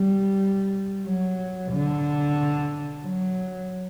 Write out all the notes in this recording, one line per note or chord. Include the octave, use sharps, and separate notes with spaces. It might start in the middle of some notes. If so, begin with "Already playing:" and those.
Already playing: G3
F#3
D3
F#3